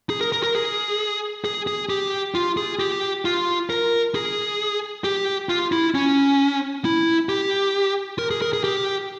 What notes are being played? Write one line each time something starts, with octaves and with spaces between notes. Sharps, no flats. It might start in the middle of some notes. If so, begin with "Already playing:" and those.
G#4
A#4
A#4
A#4
G#4
G#4
G#4
G4
F4
G#4
G4
F4
A#4
G#4
G4
F4
E4
C#4
E4
G4
A#4
G#4
A#4
G#4
G4